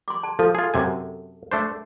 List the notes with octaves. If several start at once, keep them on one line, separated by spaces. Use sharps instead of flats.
C6 D6
A5
F3 A4
F4 G#4
F#2 C3 G#5
A3 D4 C5